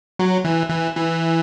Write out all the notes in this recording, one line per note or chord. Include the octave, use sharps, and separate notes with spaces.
F#3
E3
E3
E3